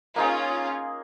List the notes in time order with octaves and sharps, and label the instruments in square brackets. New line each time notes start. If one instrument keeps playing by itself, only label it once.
[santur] A#3 D#4 G#4 [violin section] C#4 F4